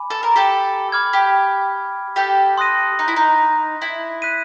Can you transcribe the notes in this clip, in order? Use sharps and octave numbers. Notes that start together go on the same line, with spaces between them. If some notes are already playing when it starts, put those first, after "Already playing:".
Already playing: G#5 B5 D6
A4
A#4
G4 A4
B5 D6 F6 G#6
G4
G4 A4
C6 D#6 F#6 A#6 D#7
D#4
E4
D#4
E4
F#6 B6 D#7